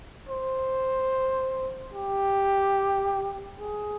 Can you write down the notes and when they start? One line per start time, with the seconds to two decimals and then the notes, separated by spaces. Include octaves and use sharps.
0.29 C5
1.93 G4
3.58 G#4